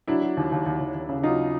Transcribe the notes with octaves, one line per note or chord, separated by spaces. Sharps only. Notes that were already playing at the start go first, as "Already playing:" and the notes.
F#3 D4 E4
F#3
D#2
D#2
D#2
D#2
D#2
C#3
F#3 D#4 F4